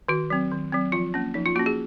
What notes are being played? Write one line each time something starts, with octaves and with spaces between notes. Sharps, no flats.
D#3 F#4
F#3 C4
D#3
F#3 C4
F3 F4
A#3 C#4
F3 D#4
F4
A#3 C#4 F#4
G#4